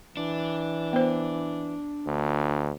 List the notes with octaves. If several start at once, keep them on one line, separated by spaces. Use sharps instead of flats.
E3 D4
B3 C5
D2